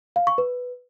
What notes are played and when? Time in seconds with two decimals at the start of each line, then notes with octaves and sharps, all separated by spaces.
0.16 F5
0.27 C#6
0.38 B4